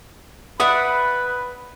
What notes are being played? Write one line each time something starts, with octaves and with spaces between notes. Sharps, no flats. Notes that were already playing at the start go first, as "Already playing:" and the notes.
B4 D5 E5 F#5 B5 D#6